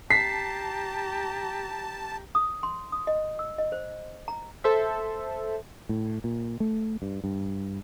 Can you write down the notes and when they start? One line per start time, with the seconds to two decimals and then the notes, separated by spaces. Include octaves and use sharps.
0.10 G4 A5 A#5 B6 C7
2.35 D#6
2.63 C6
2.92 D#6
3.07 D#5
3.39 E6
3.59 D#5
3.72 C5
4.28 A#5
4.64 A4 C5 E5
5.89 A2
6.24 A#2
6.60 A3
7.02 G2
7.24 G2